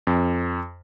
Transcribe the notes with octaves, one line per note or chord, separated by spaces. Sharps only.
F2